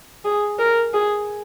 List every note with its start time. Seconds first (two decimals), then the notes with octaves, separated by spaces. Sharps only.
0.24 G#4
0.59 A#4
0.93 G#4